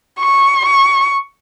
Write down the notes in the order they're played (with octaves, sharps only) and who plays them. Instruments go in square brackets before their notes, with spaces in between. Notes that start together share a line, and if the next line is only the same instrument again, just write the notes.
[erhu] C#6
C#6